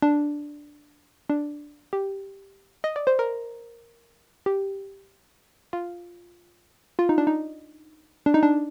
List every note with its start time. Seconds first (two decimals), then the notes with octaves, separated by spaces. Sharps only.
0.02 D4
1.30 D4
1.93 G4
2.84 D#5
2.96 D5
3.07 C5
3.19 A#4
4.46 G4
5.73 F4
6.99 F4
7.09 D#4
7.18 D4
7.27 D#4
8.26 D4
8.34 D#4
8.43 D4